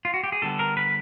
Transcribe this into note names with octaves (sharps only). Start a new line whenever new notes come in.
F4
F#4
G4
G#4
D3 G3 B3 A4
A#4
B4